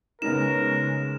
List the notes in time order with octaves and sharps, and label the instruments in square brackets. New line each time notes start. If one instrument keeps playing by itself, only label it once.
[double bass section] C#3 G#3 [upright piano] B3 C#4 D#4 [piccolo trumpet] A#4 [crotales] E7